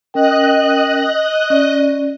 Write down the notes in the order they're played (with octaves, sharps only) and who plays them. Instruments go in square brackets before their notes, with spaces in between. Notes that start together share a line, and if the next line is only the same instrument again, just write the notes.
[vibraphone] C#4 A#4 G5 [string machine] D#5 F#6
[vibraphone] C#4 D5